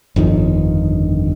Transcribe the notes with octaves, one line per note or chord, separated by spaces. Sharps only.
G1 F2 D#3